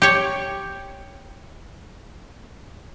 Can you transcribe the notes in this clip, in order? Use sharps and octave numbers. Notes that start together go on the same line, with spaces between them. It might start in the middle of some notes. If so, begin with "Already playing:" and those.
G4 C#5